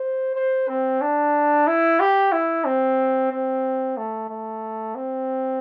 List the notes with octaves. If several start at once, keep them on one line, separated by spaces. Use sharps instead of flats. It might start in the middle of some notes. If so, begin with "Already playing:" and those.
Already playing: C5
C5
C4
D4
E4
G4
E4
C4
C4
A3
A3
C4